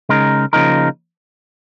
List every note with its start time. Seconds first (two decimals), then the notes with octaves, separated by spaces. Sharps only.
0.09 C#3 G#3 D#4 A#4
0.53 C#3 F3 A#3 D#4 A#4